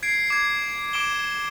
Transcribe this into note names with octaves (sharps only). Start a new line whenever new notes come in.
G#6 C7 D7
D6 G#6
D6 D7 E7 G7